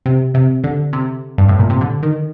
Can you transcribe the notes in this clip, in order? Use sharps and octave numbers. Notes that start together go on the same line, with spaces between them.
C3
C3
D3
C3
G2
A2
A#2
C3
D3
D#3